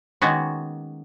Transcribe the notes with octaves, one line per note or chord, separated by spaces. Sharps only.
D#3 G#3 A#3 B3 C#4 F#4